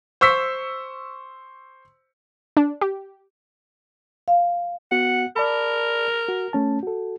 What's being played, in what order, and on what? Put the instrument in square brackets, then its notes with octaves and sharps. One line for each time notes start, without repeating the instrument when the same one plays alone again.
[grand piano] C5 C#6 E6 B6
[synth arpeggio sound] D4
G4
[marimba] F5
[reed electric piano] B3 F#4 [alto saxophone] F#5
[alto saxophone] A#4 [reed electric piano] D5 A5 B5
[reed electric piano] F#4
A3 C#4 A5
F#4 A4